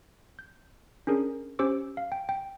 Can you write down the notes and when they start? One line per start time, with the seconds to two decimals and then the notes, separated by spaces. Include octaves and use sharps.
0.39 G6
1.07 C#4 D4 G#4 A#4
1.59 C#4 G4 C5 D6 E6
1.97 F5
2.12 G5
2.29 G5